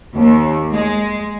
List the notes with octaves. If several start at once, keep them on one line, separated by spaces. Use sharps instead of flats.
D#2
G#3